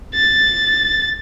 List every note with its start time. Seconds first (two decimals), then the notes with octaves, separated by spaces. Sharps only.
0.15 A6